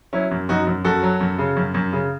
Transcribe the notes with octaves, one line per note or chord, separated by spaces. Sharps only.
F#3 C#4 E4
F#2
F#2 D#4 F#4
F#2
F#2 F#4 A4
F#3
F#2
C#3
F#2
F#2
C#3